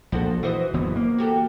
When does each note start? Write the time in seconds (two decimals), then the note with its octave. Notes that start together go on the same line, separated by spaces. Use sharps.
0.12 A#1 F3 F#4 A4
0.43 E3 F#4 C5 D#5
0.74 F#1 E3 B3
0.96 A#3
1.18 F#4 G4 A4